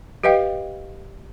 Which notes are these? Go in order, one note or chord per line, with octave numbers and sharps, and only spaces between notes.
G4 B4 D#5 F5 G5